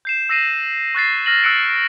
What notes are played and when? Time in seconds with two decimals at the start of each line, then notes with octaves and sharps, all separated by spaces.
0.05 G6 C7 E7
0.29 E6 A#6 C7 D#7 E7
0.95 C#6 F#6 A6 C7
1.26 F6 A#6 D#7 F#7
1.43 E6 F#6 C#7 D7 F#7
1.70 D7